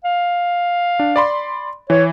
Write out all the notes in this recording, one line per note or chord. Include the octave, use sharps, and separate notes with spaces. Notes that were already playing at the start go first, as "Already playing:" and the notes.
F5
D4
D5 B5 C6
E3 C#5